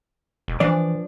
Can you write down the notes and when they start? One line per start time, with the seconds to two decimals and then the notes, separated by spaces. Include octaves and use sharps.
0.48 E1
0.60 E3 F3 D4 D5